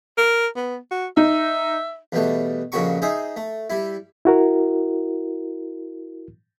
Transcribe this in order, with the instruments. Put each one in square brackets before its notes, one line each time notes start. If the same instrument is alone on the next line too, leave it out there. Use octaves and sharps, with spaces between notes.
[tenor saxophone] A#4
B3
F#4
[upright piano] D#4 [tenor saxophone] E5
[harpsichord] E2 B2 G3 A3
F2 A#2 C#3 F#4 B5 C#6
D#4 G#4 C5 E5
A3
G3 E4
[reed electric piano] E4 F#4 A#4